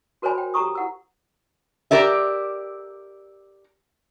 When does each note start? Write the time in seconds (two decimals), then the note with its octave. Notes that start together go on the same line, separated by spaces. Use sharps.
0.22 F#4 A#4 C5 C#5 G#5 B5
0.38 G5
0.54 G4 A4 A#5 C#6 D#6
0.75 E4 F#5 E6
1.91 G4 A#4 D5 E5